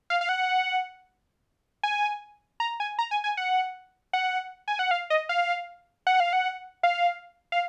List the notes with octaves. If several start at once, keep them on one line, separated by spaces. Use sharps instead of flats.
F5
F5
F#5
G#5
A#5
G#5
A#5
G#5
G#5
F#5
F#5
G#5
F#5
F5
D#5
F5
F#5
F5
F#5
F5
F5